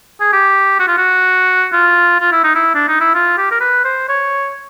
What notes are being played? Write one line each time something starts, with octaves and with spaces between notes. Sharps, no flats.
G#4
G4
F#4
F4
F#4
F4
F4
E4
D#4
E4
D4
D#4
E4
F4
G4
A#4
B4
C5
C#5